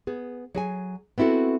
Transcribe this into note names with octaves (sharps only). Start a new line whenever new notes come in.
B3 G#4
F#3 G#4 G#5
B3 C4 E4 F#4 A4